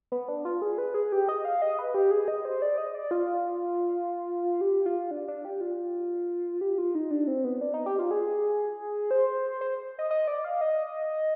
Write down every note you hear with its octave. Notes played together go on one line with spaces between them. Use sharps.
B3
D4
F4
G#4
B4
G#4
G4
D#5
F5
D#5
B4
G4
G#4
D#5
C5
D5
D#5
D5
F4
G4
F4
D4
D4
G4
F4
G4
F4
D#4
D4
C4
B3
D4
D#4
G4
F4
G#4
C5
C5
D#5
D#5
D5
F5
D#5